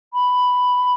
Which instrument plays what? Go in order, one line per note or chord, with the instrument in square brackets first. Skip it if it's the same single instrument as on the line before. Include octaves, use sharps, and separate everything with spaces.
[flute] B5